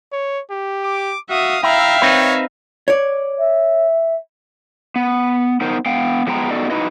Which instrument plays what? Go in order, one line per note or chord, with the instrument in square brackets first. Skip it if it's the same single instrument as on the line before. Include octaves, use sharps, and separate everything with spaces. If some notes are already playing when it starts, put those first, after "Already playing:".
[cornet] C#5
G4
[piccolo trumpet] D6
[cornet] F#4 [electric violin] E5 D#6 [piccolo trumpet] F5
[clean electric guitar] E4 [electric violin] E5 F5 [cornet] G5 [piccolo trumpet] A#5
[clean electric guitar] C4 D#4 B4 [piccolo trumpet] C#5
[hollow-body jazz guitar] C#5 D5
[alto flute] E5
[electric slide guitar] B3
B3 D#4 A#4 C5
B3 F5 G5
F3 G#3 B3 G5 A#5
B3 D#4 F#4 A4 D5 D#5
D#4 E4 F#4 B4 D#5